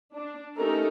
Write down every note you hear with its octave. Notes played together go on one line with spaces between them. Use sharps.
D4
A3 C#4 D#4 G4 A4 A#4